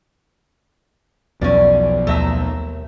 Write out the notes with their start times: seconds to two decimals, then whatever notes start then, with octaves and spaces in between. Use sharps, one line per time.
1.41 B1 E2 F3 B3 C#4 D5
2.07 D#2 A3 E5 A#5